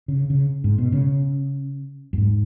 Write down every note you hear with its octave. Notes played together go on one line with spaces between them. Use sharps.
C#3
C#3
G#2
B2
C#3
F#2
G#2